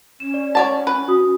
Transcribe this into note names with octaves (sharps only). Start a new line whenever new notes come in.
C#4 E7
D5
C#5 D5 F#5 A5
B4
F#4 D#6